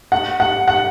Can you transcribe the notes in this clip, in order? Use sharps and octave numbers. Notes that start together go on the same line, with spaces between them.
F#5
F#5
F#5